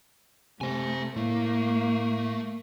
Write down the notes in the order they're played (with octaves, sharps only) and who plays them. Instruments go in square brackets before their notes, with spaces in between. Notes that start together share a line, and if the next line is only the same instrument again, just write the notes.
[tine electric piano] C3 [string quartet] A3 [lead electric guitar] C5 G#5
[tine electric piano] A2 [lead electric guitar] A3 [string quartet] A#3